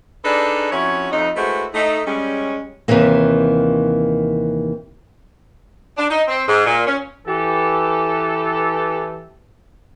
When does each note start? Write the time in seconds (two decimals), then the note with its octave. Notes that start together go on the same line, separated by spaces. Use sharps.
0.24 D4 D#4 G#4 A4 B4 D5
0.71 F2 C#4 E4 F#4 C#5
1.11 F2 D#4
1.35 G#3 A3 E4 F#4 B4 C5
1.74 A3 D#4
2.06 G3 G#3 C#4
2.88 D#2 C3 D#3 E3 A#3
5.97 D4
6.10 D#4
6.28 C4
6.47 G#2
6.67 A#2
6.86 C#4
7.27 E3 G4 A4